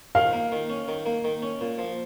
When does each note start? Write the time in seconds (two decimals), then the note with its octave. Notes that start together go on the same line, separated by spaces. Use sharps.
0.15 D#3 F5
0.33 A#3
0.52 D#3
0.70 C#4
0.88 D#3
1.06 A#3
1.24 D#3
1.42 C#4
1.61 A#2
1.78 F3